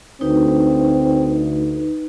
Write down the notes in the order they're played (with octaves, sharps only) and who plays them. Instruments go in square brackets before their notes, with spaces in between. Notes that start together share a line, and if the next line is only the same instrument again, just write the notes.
[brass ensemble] D2 [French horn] C4 [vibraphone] D#4 B4